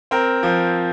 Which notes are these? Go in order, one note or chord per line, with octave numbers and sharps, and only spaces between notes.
C4 A#4
F3